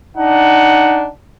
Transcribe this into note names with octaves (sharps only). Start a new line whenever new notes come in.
D4 D#4 F#5